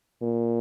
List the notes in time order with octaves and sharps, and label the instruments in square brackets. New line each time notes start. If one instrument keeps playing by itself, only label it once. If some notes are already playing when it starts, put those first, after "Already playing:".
[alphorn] A#2